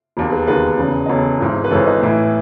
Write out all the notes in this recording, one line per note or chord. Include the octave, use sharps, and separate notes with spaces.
E1 D#2 D#3
G#4 B4
E1 D#2 D#3 G#4 B4
E1 E2 C#3
D#5
E1 E2 C#3 A4 C#5
G#1 G#2 E3
B4
G#1 G#2 E3 A4 C#5
B4 D#5
A1 A2 E3